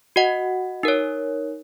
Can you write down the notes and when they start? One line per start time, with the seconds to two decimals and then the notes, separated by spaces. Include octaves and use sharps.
0.16 F#4 D#5 F#5
0.83 D#4 A#4 C#5